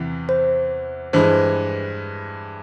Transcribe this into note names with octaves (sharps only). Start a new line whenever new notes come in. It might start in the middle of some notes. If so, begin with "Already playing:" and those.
Already playing: E2 C3 E3
C5
G2 E3 G#3 C5